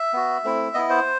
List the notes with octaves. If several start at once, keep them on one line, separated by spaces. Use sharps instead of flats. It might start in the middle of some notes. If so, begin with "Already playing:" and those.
Already playing: E5
B3 F#4
A3 C4 E4
B3 E4 D#5
C5